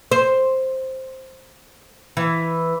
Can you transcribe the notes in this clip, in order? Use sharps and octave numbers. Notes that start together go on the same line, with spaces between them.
C5
E3